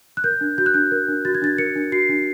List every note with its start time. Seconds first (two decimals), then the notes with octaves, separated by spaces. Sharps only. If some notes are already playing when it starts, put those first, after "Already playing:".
0.17 F#6
0.24 A#4 G6
0.41 D4
0.58 F#4 G6
0.66 F#6
0.74 D4 G6
0.92 A#4
1.08 D4
1.25 F#4 A6
1.35 G#6
1.42 D4 A6
1.58 A#4 C#7
1.76 D4
1.92 F#4 C7
2.09 D4